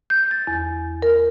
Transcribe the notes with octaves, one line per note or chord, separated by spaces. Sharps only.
G6
A6
E2
A#4